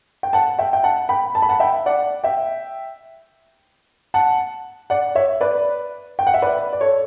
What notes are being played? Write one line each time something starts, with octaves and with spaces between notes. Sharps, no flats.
G5
F#5 A5
E5 G5
G5
F#5 A5
G5 B5
A5
B5
F#5 A5
E5 G5
D5 F#5
E5 G5
F#5 A5
D5 F#5
C#5 E5
B4 D5
G5
F#5
E5
B4 D5
D5
A4 C#5